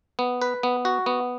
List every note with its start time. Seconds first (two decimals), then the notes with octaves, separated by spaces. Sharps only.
0.19 B3
0.42 B4
0.63 B3
0.85 F#4
1.06 B3